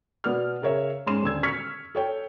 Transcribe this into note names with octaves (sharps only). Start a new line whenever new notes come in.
B2 B3 D5 F6
C#3 A#4 C#5 E5
G#2 C#4 C6 E7
D#1 D3 E6 G#6
C#6 F6 G#6 B6 C#7
A4 C#5 G5